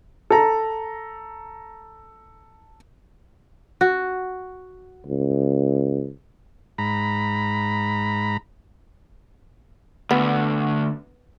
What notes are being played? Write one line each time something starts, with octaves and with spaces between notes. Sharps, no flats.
A4 A#5
F#4
C#2
G#2 A#5 B5
D2 B3